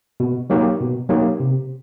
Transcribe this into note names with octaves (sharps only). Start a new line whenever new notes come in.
B2
F#3 A#3 D#4 G4
B2
F#3 A#3 D#4 G4
C3